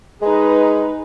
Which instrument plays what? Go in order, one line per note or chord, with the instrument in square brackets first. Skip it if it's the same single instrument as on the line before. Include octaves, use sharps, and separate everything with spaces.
[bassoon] G#3 [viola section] D#4 G#4 B4